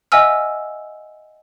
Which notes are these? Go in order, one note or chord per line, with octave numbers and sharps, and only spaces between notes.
D#5 E5 F#5 G#5 E6 F6